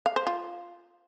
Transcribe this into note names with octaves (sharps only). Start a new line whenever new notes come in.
F5
C5
F4